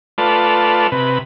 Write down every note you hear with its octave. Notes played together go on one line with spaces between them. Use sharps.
A3 F4 B4 D5 A5
C3 B4